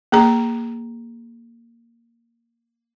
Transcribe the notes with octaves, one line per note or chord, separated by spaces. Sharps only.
A#3 G#4 A#5